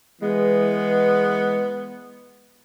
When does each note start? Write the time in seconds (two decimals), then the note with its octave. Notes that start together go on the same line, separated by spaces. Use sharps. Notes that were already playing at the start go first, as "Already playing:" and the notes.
0.21 E3 G#3 B3